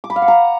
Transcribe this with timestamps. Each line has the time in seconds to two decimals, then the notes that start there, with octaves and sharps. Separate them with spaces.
0.04 D6
0.10 B5
0.16 F5
0.22 F#5
0.28 A#5